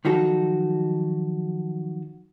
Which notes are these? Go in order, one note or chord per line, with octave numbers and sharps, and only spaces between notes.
D#3 F3 F#3 D#4 F#4 A4